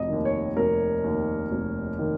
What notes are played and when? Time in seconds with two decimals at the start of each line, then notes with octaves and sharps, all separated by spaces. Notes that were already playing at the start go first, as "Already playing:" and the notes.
Already playing: F1 D#5
0.09 D#2 D#3
0.25 C#5
0.57 F1 A#4
1.04 D#2 D#3
1.51 F1
1.99 D#3